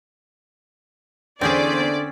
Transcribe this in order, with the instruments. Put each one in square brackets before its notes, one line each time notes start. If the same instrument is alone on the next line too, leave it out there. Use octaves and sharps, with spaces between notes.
[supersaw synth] E2 C5 B6 [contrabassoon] D3 [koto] C4 C#4 G#4 [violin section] D5